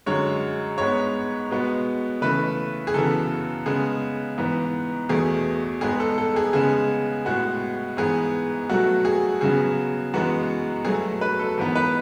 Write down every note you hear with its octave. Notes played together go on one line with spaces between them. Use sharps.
F#2 D3 G#3 C#5
G#2 G#3 B3 C#5
B2 G#3 B3
C#3 E3 A3 B4
G#4
F#2 C#3 E3 B3 A4
C#3 G#3 B3 G#4
G#2 E3 B3
E2 B2 A3 G#4
G#2 G#3 B3 G#4
A4
A4
G#4
C#3 G#3 B3 G#4
A2 G#3 B3 F#4
G#2 E3 B3 G#4
B2 F#3 A3 F#4
G#4
C#3 F#3 B3 G#4
F#2 E3 G#3 B3 F#4
B2 F#3 A3 G#4
B4
A4
G#2 E3 B3
B4